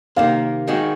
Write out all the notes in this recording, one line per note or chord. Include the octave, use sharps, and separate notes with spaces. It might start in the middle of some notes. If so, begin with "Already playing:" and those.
C3 D#3 A#3 F5
D#3 G#3 C4 F#4